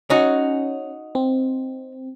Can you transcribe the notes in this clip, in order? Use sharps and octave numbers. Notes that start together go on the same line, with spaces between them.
C#4 D#4 F#4
C4